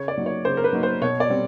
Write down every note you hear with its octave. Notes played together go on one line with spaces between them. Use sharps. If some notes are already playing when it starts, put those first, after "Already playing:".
Already playing: C#3 C#5
D5
F#3 A#3 D#4
C#5
C#3 C5
A#4
B4
F#3 A#3 D#4
C5
B2 C#5
D5
G3 C4